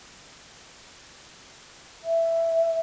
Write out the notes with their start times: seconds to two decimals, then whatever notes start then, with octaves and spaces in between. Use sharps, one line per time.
2.04 E5